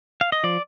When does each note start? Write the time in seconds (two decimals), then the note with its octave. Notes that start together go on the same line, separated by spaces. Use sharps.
0.21 F5
0.32 D#5
0.44 F3 D5